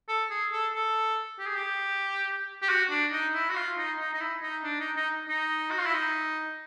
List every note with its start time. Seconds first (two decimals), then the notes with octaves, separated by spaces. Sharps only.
0.09 A4
0.31 G#4
0.52 A4
0.74 A4
1.39 G4
1.47 G#4
1.56 G4
2.62 G4
2.69 F#4
2.90 D4
3.12 D#4
3.34 E4
3.50 F#4
3.55 F4
3.77 D#4
3.99 D#4
4.14 D#4
4.20 E4
4.42 D#4
4.64 D4
4.80 D#4
4.97 D#4
5.29 D#4
5.70 F#4
5.78 F4
5.86 E4
5.94 D#4